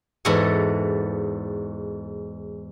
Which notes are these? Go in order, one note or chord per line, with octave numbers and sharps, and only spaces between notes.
E2 G#2 F#4 A4 F#5 G#5